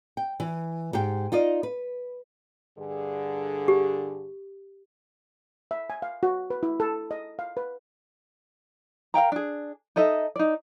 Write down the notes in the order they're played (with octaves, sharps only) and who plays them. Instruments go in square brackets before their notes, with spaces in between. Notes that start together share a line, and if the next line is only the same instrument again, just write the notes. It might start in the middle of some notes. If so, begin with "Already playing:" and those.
[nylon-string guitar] G5
E3
G#2 G4 G5
D#4 F4 D5 D#5
B4
[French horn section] G2 D3 G#4
[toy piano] G4
[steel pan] E5
G#5
F5
F#4
B4
E4
A4
D#5
F5
B4
[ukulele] A#4 F5 G5 A#5
D4 G#4
D#4 A4 D#5 E5
D#4 D5